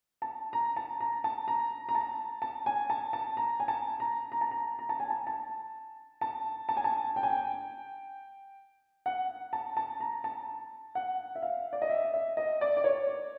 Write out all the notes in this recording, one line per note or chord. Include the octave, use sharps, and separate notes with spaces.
A5
A#5
A5
A#5
A5
A#5
A#5
A5
A5
G#5
A5
A5
A#5
G#5
A5
A#5
A#5
A5
A#5
A#5
A5
G#5
A5
A5
A5
A5
G#5
A5
G5
G#5
G5
F#5
A5
A5
A#5
A5
F#5
E5
F5
D5
D#5
E5
E5
D#5
D5
D5
C#5